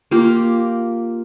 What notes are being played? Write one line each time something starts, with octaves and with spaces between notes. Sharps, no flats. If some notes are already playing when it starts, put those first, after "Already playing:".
A#3 F4 G4